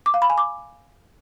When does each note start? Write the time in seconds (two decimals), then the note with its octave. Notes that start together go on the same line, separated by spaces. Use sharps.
0.06 D6
0.14 F5
0.22 B5
0.30 G#5
0.38 D6